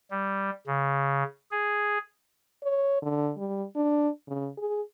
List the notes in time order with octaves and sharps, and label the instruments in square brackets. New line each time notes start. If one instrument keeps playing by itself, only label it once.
[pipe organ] G3
C#3
G#4
[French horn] C#5
D3
G3
D4
C#3
G#4